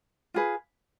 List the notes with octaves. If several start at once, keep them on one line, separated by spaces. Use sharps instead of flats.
F4 G#4 B4